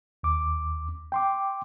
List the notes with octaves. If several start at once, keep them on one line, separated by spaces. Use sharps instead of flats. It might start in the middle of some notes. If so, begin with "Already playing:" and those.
D#2 D6
G5 C6 D6